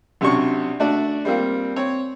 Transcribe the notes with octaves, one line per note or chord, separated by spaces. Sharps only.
B1 C3 C#4 D4 C#6
A3 D4 F#4 D5
G3 A#3 C4 F4
C4 C#5